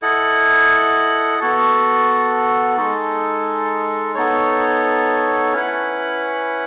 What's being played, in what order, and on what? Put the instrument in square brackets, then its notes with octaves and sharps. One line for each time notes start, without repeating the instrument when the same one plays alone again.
[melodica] E4 A4 D#5 F#5
B3 F#4 A4
G#3 D#4 A4
B3 D#4 A4 C#5
C#4 E4 B4 F#5